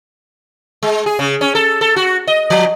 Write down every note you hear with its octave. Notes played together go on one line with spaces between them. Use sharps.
G#3
G#4
C#3
C#4
A4
A4
F#4
D#5
F3